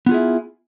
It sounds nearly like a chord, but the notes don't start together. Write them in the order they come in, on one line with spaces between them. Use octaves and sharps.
B3 F4 G#4 E4